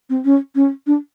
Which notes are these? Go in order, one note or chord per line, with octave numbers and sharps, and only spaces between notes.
C4
C#4
C#4
D4